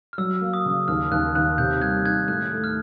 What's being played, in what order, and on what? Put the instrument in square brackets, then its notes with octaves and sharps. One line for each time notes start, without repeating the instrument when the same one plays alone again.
[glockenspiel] F6
[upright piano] F#3 [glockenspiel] E6
[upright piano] A#3
[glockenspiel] D#6
[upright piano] C#3
[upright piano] D#2 [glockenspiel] F6
[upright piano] D#2 [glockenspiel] F#6
[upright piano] D#2 [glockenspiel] F#6
[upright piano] C3 [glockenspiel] G6
[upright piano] G3 [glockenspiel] F#6 G#6
[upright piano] D#3 [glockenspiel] F#6 G#6
[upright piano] A2 [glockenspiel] F#6
[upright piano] A3
[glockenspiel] F6